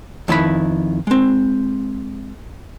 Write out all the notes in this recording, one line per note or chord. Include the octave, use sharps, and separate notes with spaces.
F2 D#3 E4 B4 B5
G#3 C4